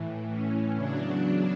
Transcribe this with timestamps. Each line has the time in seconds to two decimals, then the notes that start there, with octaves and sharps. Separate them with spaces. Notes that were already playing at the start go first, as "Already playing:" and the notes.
Already playing: A2 E3
0.29 C#4
0.76 E2 C#3 F#3 D4